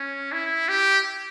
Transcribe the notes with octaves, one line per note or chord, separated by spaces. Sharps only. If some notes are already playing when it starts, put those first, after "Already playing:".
Already playing: C#4
E4
G4